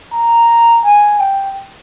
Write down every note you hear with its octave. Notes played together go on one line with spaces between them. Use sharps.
A#5
G#5
G5